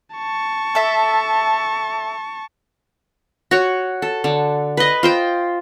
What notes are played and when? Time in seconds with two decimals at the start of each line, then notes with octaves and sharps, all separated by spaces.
0.16 A5 C#6
0.75 A4 E5
3.51 F#4 C#5
4.02 A4
4.24 D3
4.77 B4 D#5
5.03 F4 C5 G5